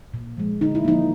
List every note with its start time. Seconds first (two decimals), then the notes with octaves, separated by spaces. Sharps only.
0.14 A#2
0.37 F3 G#3
0.61 D3 D#4
0.75 E4
0.85 F3 A#3 D#4